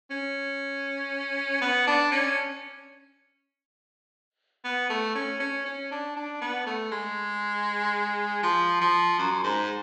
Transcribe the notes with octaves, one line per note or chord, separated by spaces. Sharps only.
C#4
B3
D4
C#4
B3
A3
C#4
C#4
C#4
D4
D4
B3
A3
G#3
F3
F3
F#2
G#2